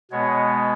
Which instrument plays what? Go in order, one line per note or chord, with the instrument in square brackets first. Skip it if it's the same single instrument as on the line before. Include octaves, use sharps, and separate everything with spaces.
[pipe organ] B2 G#3 B3 C#5